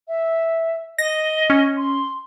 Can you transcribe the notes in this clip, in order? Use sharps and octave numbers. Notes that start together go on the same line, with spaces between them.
E5
D#5 A#6
C#4
C6